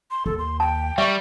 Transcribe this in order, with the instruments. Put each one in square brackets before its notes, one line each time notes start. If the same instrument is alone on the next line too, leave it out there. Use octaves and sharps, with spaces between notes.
[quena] C6
[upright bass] D#2 [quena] A4
[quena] C6
[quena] G5 [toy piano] A5
[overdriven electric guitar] G3 [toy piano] E5 [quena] C#6